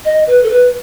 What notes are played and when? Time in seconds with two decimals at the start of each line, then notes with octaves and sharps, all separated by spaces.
0.05 D#5
0.27 B4
0.43 A4
0.50 B4